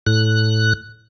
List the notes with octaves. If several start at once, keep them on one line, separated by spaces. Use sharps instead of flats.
A2 F#6